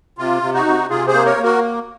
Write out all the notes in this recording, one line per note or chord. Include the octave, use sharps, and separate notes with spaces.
C3 F4
C3
D#4 F#4
C3
C3 F4 G#4
G#4 C5
A#3
A#4 C#5
A#3
F#4 A#4